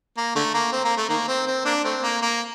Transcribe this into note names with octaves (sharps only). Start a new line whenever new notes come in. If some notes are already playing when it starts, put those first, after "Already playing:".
A#3
D3 A3
A#3
C4
A#3
A3
D#3 A#3
C4
C4
A#3 D4
A3 C4
A#3
A#3